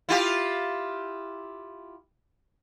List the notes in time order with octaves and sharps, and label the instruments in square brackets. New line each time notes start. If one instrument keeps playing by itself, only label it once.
[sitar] E4 F4 G4